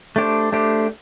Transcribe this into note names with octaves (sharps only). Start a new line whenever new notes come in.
A3 D4 G4 C5
A3 D4 G4 C5